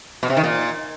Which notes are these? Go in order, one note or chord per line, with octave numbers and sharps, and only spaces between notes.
B2
C3
D#3
A#2